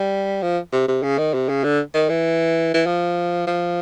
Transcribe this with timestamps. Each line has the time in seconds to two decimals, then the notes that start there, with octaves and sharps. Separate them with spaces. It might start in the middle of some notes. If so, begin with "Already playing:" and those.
Already playing: G3
0.42 F3
0.73 C3
0.88 C3
1.03 C#3
1.18 D#3
1.34 C3
1.49 C#3
1.64 D3
1.95 D#3
2.10 E3
2.74 E3
2.86 F3
3.47 F3